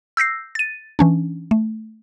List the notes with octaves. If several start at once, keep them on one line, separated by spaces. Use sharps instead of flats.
E6 G6 A#6 C7
A6 D#7
E3 C#4 D4
A3